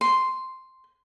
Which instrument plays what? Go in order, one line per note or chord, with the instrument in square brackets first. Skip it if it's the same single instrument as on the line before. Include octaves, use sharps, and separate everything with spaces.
[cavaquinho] C6